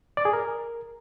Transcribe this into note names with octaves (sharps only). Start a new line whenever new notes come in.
D5
G#4
A#4